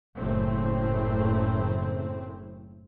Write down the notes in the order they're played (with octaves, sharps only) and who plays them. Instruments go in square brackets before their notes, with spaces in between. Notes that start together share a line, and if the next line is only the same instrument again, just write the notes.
[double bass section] F#1 A2 A3 C4